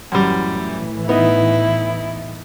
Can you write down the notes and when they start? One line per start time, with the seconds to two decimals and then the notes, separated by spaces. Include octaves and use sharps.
0.12 F#2 A2 E3 G3
1.09 B3 D#4 E4